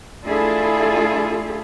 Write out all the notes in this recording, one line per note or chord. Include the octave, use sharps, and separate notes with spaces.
A3 D4 E4 F4 G#4 A4